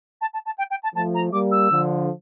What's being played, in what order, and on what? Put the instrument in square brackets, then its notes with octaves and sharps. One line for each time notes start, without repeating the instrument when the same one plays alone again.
[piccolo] A5
A5
A5
G5
G5
A5
[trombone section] F3 A3 [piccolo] A5
[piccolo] A#5
[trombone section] G3 A#3 [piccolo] D6
[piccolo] E6
[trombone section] D3 F3